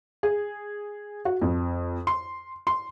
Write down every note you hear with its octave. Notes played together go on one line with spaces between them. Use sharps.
G#4
F#4
F2
C6
C6